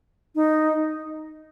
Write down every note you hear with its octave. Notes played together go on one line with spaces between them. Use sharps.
D#4